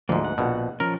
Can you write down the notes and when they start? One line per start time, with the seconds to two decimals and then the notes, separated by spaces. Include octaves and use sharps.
0.09 D2 G#2 D3 F3 A#3
0.25 F#5
0.38 A#1 B2
0.80 F3 C#4 A#4